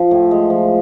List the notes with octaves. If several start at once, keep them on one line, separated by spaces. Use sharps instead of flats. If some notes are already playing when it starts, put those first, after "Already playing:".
Already playing: F3
A2
G#3
F3